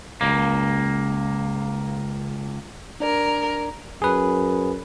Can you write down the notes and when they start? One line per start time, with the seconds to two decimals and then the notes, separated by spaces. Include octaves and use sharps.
0.21 C#2 A#3
3.00 D4 A#4 D5
4.02 F#2 G#4 B4